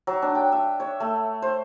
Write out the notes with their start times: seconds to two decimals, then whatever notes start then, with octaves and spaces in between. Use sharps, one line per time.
0.07 F#3
0.22 D4
0.35 G5
0.52 E5
0.80 C#5
1.00 A3
1.42 C5